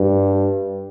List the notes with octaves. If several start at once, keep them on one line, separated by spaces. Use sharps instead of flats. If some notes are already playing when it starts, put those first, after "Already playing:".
Already playing: G2